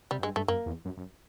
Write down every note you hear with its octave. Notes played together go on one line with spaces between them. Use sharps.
C3 G3
F#2
G2 G#3
G2 A3
F#2 A#3
E2
F#2
F#2